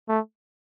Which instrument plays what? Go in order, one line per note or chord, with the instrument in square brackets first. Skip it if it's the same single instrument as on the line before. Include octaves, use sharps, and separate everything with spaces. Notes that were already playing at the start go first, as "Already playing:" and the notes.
[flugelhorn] A3